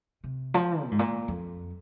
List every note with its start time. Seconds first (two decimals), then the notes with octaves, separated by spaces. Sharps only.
0.24 C3
0.54 F3
0.84 A#2
0.91 G#2
0.99 A#2
1.28 F2